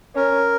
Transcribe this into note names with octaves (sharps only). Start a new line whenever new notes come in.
C#4 A#4